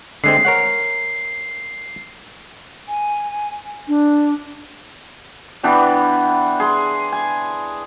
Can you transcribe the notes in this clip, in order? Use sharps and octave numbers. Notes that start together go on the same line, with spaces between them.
D3 G#3 C4 C7
A#4 C#5 F#5
G#5
D4
E3 B3 D4 G4
G#4 C6
G#5